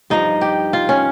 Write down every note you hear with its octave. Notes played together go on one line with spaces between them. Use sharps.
G2 F3 D#4
G4
F4
C#4